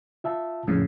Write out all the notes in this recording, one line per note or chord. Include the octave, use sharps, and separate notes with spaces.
F4 E5 A5
F2 A2 C#3